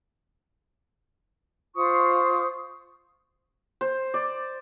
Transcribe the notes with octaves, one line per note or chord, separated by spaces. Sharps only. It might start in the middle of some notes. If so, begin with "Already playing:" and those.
F4 C5 C#6 D#6
C5
D5